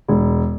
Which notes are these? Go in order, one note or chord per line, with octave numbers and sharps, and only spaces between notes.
E1